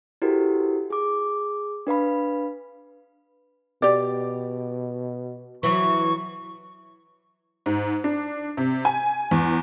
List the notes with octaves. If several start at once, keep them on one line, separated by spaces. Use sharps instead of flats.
E4 F#4 G4 A4 A#4 C5
G#4 D6
D4 B4 F5 B5
B2 G4 D5
E3 F#3 C#6
G#2
D4
C3
G#5
E2